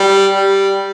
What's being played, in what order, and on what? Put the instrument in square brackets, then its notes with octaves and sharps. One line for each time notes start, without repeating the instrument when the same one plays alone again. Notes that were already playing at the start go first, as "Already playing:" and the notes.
Already playing: [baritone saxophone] G3
G3